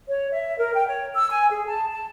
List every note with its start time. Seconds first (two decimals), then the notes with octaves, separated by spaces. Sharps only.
0.07 C#5
0.31 E5
0.56 A#4
0.74 G5
0.87 C#5
1.14 E6
1.31 G#5
1.50 G#4
1.66 A5
1.90 A5